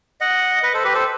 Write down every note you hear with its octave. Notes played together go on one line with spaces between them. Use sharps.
D#5 F#5
B4 D#5
A4 C5
G4 B4
A4 C5